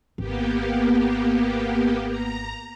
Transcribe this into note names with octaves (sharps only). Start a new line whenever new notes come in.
G#1 A#3 B3 G4
A#5